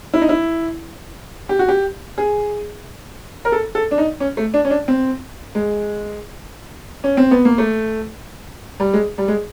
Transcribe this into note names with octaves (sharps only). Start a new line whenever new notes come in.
E4
D#4
E4
G4
F#4
G4
G#4
A#4
A4
A4
D4
D#4
C#4
A3
D4
C#4
D4
C4
G#3
C#4
C4
B3
A#3
A3
G3
G#3
G3
G#3